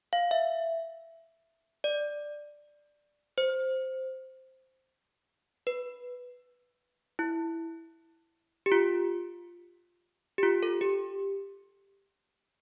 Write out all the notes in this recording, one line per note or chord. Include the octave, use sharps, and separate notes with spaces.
F5
E5
D5
C5
B4
E4
G4
F4
G4
F4
A4
G4